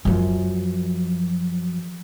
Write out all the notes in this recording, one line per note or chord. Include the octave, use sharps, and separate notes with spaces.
F#2 F3